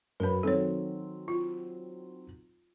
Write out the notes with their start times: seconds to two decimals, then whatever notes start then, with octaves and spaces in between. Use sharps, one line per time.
0.20 F#2 F#3 A#4 B4 B5
0.43 D#3 F#3 C4 A4 C#5
1.28 F4